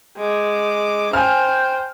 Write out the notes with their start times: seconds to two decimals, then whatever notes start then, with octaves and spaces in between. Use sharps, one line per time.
0.17 G#3 D6
1.13 C5 G5 G#5 F6